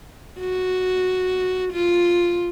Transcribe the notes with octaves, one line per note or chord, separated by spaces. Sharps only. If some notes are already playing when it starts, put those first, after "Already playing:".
F#4
F4